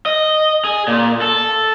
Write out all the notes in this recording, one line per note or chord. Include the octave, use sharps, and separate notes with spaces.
D#5
G#4
A#2
A4